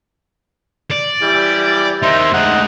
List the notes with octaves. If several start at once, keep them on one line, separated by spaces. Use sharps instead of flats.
D5
E3 G3
A#3 D#4 C5 E5
D2 G#3 D#4 F#5